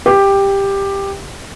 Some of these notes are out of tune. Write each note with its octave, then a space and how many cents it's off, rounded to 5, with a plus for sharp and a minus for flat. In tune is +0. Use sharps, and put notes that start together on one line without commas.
G4 +10